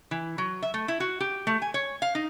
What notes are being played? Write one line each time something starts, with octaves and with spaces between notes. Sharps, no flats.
E3
F#3
E5
A3
E4
F#4
G4
A3
G#5
C#5
F5
D#4